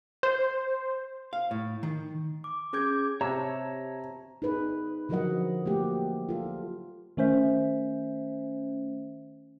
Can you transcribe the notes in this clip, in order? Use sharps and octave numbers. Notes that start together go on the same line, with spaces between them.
C5
F5
A2
D#3
D6
C#4 G#4 D6 G6 G#6
C3 C#5 A5 A#5 E6
D#4 G#4 B4
D3 F3 F#3 A#4 D#5 F#5
A3 A#3 G4
F4 A4
D#3 A3 C#4 C5 E5